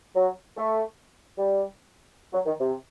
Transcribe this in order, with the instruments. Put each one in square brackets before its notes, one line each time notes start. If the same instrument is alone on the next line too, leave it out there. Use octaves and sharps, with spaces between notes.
[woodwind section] F#3
A3
G3
F#3
D#3
C3